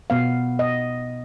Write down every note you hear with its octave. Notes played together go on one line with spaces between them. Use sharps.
B2 B3 F5
D#5